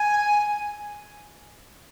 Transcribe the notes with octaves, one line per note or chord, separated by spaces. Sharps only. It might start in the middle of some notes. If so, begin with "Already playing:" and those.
Already playing: G#5